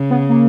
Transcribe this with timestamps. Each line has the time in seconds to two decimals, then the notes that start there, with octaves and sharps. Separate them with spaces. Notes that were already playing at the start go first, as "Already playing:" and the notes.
Already playing: C#3
0.10 B3
0.29 A#3